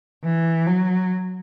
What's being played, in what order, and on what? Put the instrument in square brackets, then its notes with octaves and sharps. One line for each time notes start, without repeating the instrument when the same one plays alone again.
[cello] E3
F#3